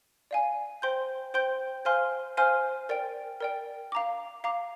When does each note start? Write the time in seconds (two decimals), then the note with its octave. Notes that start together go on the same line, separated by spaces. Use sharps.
0.31 D5 F5 G#5
0.82 C5 G5 C6 G6
1.34 C5 G5 C6 G6
1.85 C5 F5 G#5 C6 F6
2.37 C5 F5 G#5 C6 F6
2.89 A#4 D5 G5
3.40 A#4 D5 G5
3.92 F5 A#5 D6
4.44 F5 A#5 D6